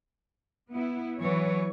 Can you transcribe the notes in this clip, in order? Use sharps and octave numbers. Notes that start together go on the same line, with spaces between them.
B3 E4
E3 F#3 C#5